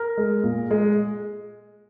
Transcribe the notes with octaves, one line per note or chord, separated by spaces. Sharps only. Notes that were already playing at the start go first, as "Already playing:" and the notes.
Already playing: A#4
G#3
A#2
G#3